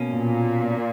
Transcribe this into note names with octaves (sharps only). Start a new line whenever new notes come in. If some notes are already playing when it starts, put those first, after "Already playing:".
Already playing: B2 A#3 C#4
A#2